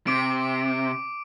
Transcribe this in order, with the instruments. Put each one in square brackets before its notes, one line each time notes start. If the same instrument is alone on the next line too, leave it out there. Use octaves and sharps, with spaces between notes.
[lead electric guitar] C3 [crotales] D6 D7